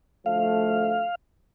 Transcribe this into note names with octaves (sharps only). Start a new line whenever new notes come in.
D2 F3 A3 F5